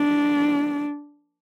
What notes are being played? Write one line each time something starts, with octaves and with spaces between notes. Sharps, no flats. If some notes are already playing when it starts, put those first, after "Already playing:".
Already playing: D4